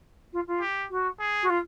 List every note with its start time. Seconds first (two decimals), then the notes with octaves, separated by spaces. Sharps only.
0.32 F4
0.47 F4
0.61 G4
0.90 F#4
1.20 G#4
1.42 F#4
1.49 F4